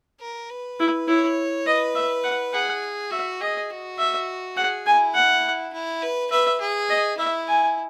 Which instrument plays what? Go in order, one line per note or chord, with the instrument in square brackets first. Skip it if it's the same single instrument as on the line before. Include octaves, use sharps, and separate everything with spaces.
[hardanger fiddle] A#4
B4
[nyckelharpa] E4
[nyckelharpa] E4 [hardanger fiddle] C#5
[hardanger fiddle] B4 [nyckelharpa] D#5
[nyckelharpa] E5
F#5
[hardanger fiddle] G#4 [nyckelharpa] F#5
[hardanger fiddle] F#4 [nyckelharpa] E5
[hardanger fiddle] G#4 [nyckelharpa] D#5
[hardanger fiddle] F#4
[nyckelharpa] E5
[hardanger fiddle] G#4 [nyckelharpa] F#5
[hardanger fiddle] E4 [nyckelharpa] G#5
[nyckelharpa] F#5
[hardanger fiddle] E4
B4
[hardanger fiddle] B4 [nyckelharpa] E5
[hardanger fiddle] G#4
[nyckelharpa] D#5
[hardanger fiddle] E4 [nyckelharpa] E5
[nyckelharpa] G#5